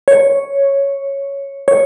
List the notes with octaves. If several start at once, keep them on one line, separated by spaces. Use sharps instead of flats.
C#5
C#5